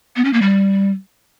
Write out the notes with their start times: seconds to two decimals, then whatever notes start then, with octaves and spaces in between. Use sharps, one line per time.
0.16 B3
0.25 C#4
0.33 A#3
0.42 G3